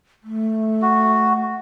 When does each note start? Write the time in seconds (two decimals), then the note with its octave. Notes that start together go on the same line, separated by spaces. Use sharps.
0.24 A3
0.82 F#4